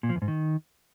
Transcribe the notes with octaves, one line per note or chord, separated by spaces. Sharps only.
A#2
F3
E2
G#2
D#3